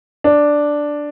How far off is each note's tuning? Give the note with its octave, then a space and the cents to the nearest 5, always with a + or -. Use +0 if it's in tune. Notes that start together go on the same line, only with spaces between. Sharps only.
D4 +0